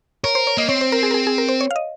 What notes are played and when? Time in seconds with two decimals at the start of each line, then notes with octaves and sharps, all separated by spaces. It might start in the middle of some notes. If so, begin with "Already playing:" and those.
0.24 A#4 C#5
0.35 C5
0.47 C#5
0.57 A#3 D#5
0.69 C4 C#5
0.81 C5
0.92 A#4
1.03 G#4
1.11 A#4
1.14 G#4
1.27 G#4
1.38 A#4
1.49 C5
1.61 C#5
1.71 F5
1.76 D#5